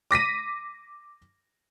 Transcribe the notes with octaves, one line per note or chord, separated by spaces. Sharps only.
D6 A#6 B6 D#7